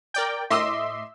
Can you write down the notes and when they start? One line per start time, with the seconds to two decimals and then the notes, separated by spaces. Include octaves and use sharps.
0.14 A#4 D5 G5
0.50 A2 D#5 E5 C6 D6 E6